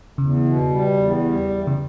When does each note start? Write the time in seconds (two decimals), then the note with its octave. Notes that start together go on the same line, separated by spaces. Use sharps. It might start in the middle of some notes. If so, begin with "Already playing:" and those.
0.18 E2 C#3
0.44 B2
0.70 G3
0.97 E2
1.23 G3
1.50 E2
1.67 C#3